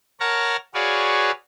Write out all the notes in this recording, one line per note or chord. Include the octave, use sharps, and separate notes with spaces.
A#4 C#5 F#5 A5 A#5 F6
F#4 G#4 B4 C#5 D5 F5